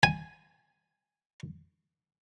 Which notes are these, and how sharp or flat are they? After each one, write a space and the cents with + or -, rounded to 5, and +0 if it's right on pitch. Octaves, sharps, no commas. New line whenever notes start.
G#5 +0